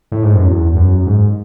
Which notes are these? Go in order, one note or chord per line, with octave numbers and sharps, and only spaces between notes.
A2
G#2
F#2
E2
F#2
G#2